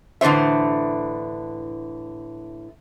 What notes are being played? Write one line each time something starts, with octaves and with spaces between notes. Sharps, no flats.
A2 D3 E3 C5 E5